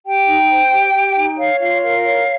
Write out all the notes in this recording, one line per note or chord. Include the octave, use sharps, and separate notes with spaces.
G4 G5
D#4
C5
G4
G4
D#4
C#5 F5
F4 F5
A#4 F5
C#5